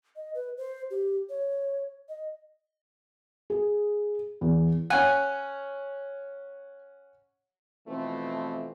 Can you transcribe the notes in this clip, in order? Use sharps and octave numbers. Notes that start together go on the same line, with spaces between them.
D#5
B4
C5
G4
C#5
D#5
G#4
E2
C#4 F#5 G#5
B2 E3 F3 A3 C4